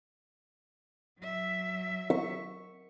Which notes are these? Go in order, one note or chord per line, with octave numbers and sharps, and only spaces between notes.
F#3 E5
C#6